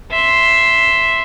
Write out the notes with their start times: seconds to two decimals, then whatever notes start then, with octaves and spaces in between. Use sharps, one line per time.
0.11 E5 C6